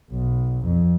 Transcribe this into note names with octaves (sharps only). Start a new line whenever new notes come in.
B1
F2